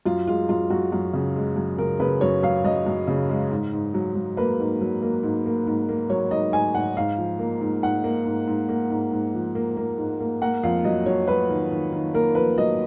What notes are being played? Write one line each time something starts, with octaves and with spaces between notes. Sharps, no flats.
F#2 F4
G#3 F4
F#2 F4
F#2 F#4
F#2
C#3
G#3
F#2
C#3 A#4
C#3 B4
F#2 C#5
F#2 F5
F#2 D#5
F#2
C#3
G#3
G#2
G#2
F#3
F#3
A#3 B4
G#2
F#3
A#3
G#2
A#3
G#2
A#3
F#3 C#5
G#2 D#5
G#2 G#5
G#2 F#5
G#2 F5
F3
A#3
G#2
G#2 F#5
A#3
G#2
G#2
A#3
G#2
G#2
F3
A#3
A#3
G#2
A#3
A#3 F#5
F2 F5
F#3 D#5
F#3 C#5
F#3 B4
D#3
D#3
D#3
A#3 A#4
F2 B4
F#3 D#5